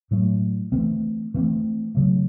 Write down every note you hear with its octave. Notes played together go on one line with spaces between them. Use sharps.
A2 F#3 A3
E3 A3 C4
E3 A3 C4
C#3 F#3 A3